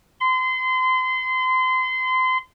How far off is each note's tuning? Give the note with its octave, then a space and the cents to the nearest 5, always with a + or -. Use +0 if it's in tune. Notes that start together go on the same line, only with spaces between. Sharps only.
C6 -30